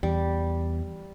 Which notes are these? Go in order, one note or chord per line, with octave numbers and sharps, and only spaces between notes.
E2 G3